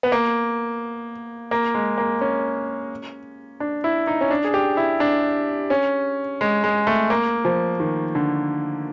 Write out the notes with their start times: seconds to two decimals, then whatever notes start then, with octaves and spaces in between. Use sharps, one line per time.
0.03 B3
0.12 A#3
1.51 A#3
1.74 G#3
1.98 A#3
2.21 C#4
3.60 D4
3.84 E4
4.07 D#4
4.21 C#4
4.30 D4
4.44 G#4
4.54 G4
4.77 E4
5.00 D4
5.70 C#4
6.41 G#3
6.64 G#3
6.87 A3
7.10 A#3
7.45 F3
7.80 D#3
8.15 D3